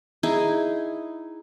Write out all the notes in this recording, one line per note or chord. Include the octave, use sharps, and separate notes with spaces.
D#4 E4 G#4